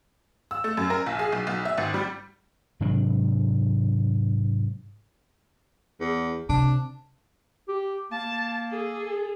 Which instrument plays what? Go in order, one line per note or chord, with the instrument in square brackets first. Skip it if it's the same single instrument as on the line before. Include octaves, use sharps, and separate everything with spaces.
[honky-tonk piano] E6
A3
F#2
A#4
A#1
G#4
B1
B1
E5
G#1
G3
[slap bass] G#2 C3 F#3 D4
[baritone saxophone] E2
[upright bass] C3 [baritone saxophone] D4
[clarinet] G4
[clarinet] A#3 [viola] A5
[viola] G#4 A4